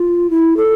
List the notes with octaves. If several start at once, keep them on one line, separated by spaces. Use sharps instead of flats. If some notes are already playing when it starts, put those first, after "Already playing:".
Already playing: F4
E4
A4